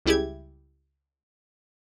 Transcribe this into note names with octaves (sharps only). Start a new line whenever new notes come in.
C#2 G3 E4 G4 G#4 G#6